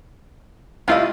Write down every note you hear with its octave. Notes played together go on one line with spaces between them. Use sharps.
C2 A3 E4 F4 D#5